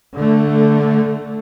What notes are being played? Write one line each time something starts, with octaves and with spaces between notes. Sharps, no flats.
D3 A3